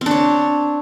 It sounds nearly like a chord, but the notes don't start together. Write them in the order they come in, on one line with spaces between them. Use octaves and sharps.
C4 D4 C#5